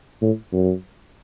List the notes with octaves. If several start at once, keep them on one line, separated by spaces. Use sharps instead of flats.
A2
F#2